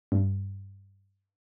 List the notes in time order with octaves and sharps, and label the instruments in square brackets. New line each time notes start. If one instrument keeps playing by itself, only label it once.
[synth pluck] G2